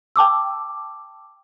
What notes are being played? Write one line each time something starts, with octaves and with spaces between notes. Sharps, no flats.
G5 A5 D6 E6